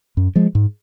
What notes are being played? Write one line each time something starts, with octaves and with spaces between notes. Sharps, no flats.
F#2
F3 G#3
G#2